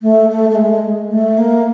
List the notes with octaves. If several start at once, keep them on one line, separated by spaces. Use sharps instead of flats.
A3
A3
A3
G#3
A3
A#3